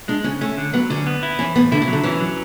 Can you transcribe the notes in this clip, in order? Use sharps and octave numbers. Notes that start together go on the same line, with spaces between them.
G#3 D4
C#3 C#4
A3 C#4
D3
F#3 B3
D3 C#4
B3
E4
E3 C#4
A2 B3
D3 E4
C#3
F#3
D3
E3 C#4
F#3